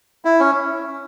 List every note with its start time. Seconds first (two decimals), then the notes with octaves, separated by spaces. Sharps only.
0.25 E4
0.40 C#4